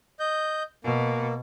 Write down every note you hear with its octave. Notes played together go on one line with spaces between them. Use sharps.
D#5 G6
B2 A#3